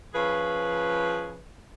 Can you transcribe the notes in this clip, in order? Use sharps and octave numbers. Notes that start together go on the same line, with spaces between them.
F3 C#4 G#4 B4